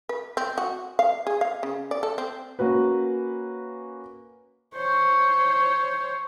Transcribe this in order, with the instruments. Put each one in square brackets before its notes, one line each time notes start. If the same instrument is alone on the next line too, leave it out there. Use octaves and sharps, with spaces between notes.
[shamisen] B4
C4
F#4
F5
G#4
F5
C#3
D5
A4
C4
[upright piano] A#3 C#4 F#4 B4
[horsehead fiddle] C5 C#5